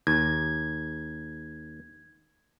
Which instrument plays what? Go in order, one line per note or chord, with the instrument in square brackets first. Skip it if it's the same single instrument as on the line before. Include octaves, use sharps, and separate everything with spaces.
[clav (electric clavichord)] D#2 [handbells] G#6